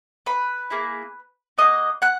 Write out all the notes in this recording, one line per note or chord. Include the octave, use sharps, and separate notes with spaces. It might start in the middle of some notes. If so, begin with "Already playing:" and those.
B4 B5
A#3 E4 G#4
A#3 C#4 F#4 D#5 D#6
F#5 F#6